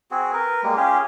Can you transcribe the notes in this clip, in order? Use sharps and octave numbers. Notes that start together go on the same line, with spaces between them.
C4 F#4 G#4
A#4 B4
G3 G#3 A#3
C#4 F4 G4 G#4